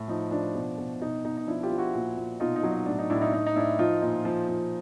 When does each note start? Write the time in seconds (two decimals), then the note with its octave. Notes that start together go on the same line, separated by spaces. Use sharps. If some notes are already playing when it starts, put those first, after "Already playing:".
Already playing: A2
0.08 F3 D#4
0.31 F3 D4
0.55 B2
0.78 B2
1.01 B2 D#4
1.24 B2 D#4
1.37 D#4
1.47 F3 D4 E4
1.63 F4 G4
1.70 F3
1.78 E4 F#4
1.94 A#2
2.17 A#2
2.40 B2 D#4 F4
2.56 D#4
2.63 F#3
2.71 D#4
2.86 A2 D4
2.99 D#4
3.10 A2 D4 E4
3.22 D#4
3.33 A2 D#4
3.47 D#4
3.56 A2 D4 E4
3.79 F3 D#4 F4
4.02 A#2 D#4
4.25 F3
4.49 F3